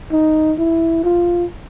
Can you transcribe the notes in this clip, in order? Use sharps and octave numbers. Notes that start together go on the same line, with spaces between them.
D#4
E4
F4